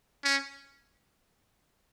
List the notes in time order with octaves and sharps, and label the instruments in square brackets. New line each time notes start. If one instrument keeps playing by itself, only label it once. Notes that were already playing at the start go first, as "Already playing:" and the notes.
[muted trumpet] C#4